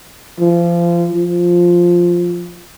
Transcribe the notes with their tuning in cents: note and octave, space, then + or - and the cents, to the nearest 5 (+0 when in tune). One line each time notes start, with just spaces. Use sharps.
F3 -30
F3 +0